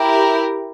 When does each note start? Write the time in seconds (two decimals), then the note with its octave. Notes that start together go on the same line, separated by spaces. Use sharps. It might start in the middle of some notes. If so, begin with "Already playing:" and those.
Already playing: E4 G4 A#4